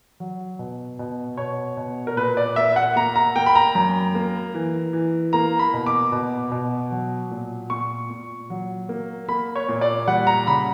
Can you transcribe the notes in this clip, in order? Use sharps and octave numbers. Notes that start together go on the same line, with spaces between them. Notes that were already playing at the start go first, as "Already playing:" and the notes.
F#3
B2
B2
B2 C#5
B2
A#4
A#2 B4
D5
A#3 E5
F#5
A#3 A#5
A#5
A#3 G5
B5
A#5
F#2
A#3
E3
E3
A#3 A#5
B5
B2
D6
B2
B2
F#3
A#2
A#2 C#6
A#2
F#3
A#3
A#3 B5
C#5
A#2
D5
G3 F#5
A#5
C#3 B5